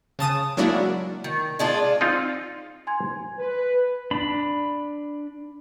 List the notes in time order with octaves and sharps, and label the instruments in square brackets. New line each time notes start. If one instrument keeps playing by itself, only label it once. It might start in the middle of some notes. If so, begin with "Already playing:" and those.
[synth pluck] C#3 A5 D#6
F#3 G#3 A#3 D4 E4 F#4
[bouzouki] D#3
G#3 D4 F4
[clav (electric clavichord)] C4 D#4 F4
[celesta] G#5 C6 G#6
[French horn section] B4
[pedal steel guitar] D4 B5